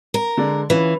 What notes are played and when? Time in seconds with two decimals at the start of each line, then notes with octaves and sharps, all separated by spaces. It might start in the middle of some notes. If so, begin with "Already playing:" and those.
0.14 A#4
0.37 D3 G#3 D5
0.70 E3 C#4 F4 B4